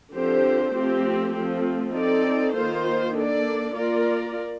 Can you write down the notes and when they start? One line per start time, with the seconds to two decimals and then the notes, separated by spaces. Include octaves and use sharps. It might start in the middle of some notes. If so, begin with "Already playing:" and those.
0.13 D3 F3 C4 G4 C5
0.74 F3 A3 C4 G4
1.34 F3 A3 C4
1.94 C4 D#4 A4 D5
2.55 D#3 A#3 F4 C5
3.15 A#3 D4 A4 D5
3.76 A#3 F4 A#4 D5